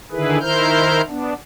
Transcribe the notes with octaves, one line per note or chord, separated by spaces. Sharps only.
D3 D#3 E4 G#4 B4
D#3 E4 A#4 C5 F6 G6
B3 D4